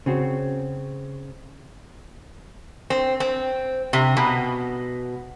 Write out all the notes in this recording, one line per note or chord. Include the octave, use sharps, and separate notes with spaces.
C#3 C4 F#4
C4
C4
C3
B2